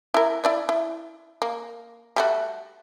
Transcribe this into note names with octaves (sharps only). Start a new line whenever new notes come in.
E4 A#4
E4 D5 E5
E4
A#3
G3 A3 F#4